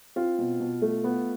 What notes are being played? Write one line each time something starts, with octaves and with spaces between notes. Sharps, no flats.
C4 F4
B2
B2
A3
B3